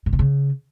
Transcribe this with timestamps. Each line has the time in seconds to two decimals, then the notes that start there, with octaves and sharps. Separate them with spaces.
0.06 A#2
0.13 C3
0.19 C#3